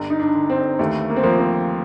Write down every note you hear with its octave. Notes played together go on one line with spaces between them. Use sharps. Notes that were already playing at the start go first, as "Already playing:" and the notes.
Already playing: G1
D#4
D4
D3
C4
D#2 A3
A#3
C4
F3 A#3
C4